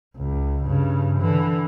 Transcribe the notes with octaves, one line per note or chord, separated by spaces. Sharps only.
C#2
G2 C#3
D3 E3